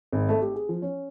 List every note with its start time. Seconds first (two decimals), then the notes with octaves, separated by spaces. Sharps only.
0.13 G#1
0.29 A3
0.42 G4
0.54 G#4
0.69 F3
0.82 C#4